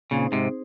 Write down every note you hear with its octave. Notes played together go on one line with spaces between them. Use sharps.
A#2 C#3 C4 D#4 G#4 C5
G#2 C3